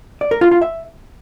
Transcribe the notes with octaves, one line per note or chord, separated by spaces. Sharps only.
D5
A#4
F4
F4
E5